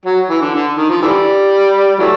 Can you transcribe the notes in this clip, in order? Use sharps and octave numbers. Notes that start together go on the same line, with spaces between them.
F#3
E3
D3
D3
D#3
F3
D3 E3 G3
E3 F#3 A3